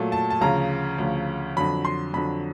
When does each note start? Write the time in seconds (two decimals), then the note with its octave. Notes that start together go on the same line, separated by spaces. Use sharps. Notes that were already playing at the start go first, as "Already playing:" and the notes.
Already playing: A#2 F#3 A3
0.12 A5
0.30 A5
0.41 D2 C#3 F3 A#5
0.99 D2 C#3 F3
1.56 F2 D3 F#3 B5
1.85 C6
2.13 F2 D3 F#3 B5